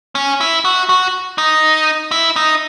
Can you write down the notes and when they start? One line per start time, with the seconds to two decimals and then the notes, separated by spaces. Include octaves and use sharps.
0.15 C#4
0.41 E4
0.65 F#4
0.89 F#4
1.38 D#4
2.11 E4
2.36 D#4